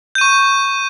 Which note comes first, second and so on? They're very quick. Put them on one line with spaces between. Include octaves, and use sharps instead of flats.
G6 D#7 C#6